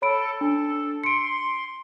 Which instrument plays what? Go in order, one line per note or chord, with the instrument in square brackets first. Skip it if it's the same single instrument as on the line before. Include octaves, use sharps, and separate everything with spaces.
[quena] A4 [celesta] C#5 B5 D7
[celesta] D4 [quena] A4
[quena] C6 [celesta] C#7 D7